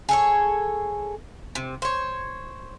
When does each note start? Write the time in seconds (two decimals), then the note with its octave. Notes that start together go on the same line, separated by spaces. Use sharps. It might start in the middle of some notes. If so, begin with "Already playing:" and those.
0.09 G#4 A4 C#5
1.55 C3
1.82 C5 C#5